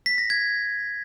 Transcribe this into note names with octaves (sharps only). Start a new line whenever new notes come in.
B6
A#6
G#6